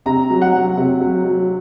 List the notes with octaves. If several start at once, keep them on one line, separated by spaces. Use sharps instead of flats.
C3 A#5
F#3
F#5
F#3
C3
F#3
F#3